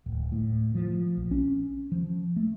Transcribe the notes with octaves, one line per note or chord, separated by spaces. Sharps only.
D1
A2
F3
A#1
C#4
F3
A3